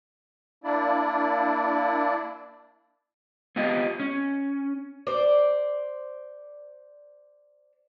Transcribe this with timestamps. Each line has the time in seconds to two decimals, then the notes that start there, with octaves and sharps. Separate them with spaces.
0.64 A#3 D4 E4 D5
3.56 B3 F4 G4 D#5
4.00 C#4
5.07 C5 D5